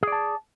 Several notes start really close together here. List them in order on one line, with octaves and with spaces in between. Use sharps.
G#4 D5 A5